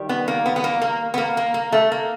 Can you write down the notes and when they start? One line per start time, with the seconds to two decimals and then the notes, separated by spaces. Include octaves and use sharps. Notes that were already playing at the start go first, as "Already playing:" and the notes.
Already playing: D#3 G3
0.09 B3
0.28 A#3
0.46 B3
0.56 B3
0.64 A#3
0.82 A#3
1.14 B3
1.18 A#3
1.37 A#3
1.54 A#3
1.72 A3
1.92 A#3